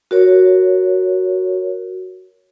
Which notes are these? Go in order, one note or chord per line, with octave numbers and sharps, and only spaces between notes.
F#4 A#4 C#5